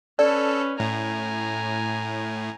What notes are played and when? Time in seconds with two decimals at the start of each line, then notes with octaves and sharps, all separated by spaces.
0.19 C#4 A4 B4 D5
0.80 A2 G#5 A#5